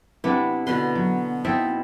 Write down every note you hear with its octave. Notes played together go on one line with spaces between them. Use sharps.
C3 B3 D4 E4
B2 D3 B3 B4 C6
F#3
C4 D#4 E4 A4 E5